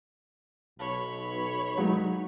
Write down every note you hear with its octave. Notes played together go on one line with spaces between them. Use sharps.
B1 C#5 B5
F#3 G#3 D#4